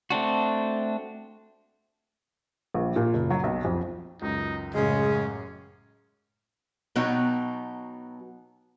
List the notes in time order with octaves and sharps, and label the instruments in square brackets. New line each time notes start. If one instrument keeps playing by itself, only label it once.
[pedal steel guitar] A3 C4 D4 F#4
[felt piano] A#1
A#2
F#1
F#3
B1
F2
[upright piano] C#2 F#2 [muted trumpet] D#4
[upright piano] A1 F#2 [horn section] C#3 [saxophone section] G#3 [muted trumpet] C#4
[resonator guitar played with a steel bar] B2 F#3 B3 D#4 G5